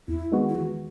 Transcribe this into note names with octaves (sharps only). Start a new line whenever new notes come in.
E2 E4
D#3 G#3 B3 F#4
E4
E2 F#4